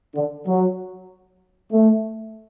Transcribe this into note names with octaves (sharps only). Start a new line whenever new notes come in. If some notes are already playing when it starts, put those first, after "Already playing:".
D3
F#3
A3